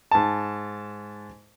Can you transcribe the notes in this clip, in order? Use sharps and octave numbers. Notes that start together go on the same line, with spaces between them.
G#2 A5